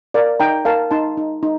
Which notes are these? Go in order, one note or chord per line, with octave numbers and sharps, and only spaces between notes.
A#4 D5 F5
D#4 G5 A#5
A#4 F5 A5
D#4 A5 C6
D#4
D#4